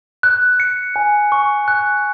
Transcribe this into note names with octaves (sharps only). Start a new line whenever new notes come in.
F#6
C#7
G#5
C#6
F#6